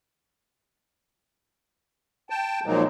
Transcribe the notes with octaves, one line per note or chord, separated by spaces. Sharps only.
G5 A5
A#2 F3 F#3 G#3 A#3 D#4